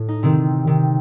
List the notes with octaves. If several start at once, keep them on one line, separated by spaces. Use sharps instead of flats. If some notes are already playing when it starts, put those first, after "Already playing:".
Already playing: A2
D#4
C3 D#3 C4
C3 D#3